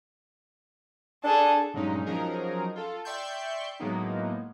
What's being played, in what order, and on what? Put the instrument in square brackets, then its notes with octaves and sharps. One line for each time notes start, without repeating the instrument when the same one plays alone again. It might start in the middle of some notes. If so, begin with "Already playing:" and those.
[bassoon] D4 [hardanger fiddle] G#4 A4
[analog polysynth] G2 A#2 F#3 G#3 C#4 D#4
F3 F#3 C#4 D#4 G#4 A#4
F4 A4
D5 E5 G5 C6 C#6 G6
A2 F#3 G#3 A#3 B3 D#4